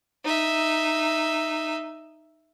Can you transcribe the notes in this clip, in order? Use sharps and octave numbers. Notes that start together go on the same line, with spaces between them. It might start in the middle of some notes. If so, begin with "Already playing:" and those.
D#4 E5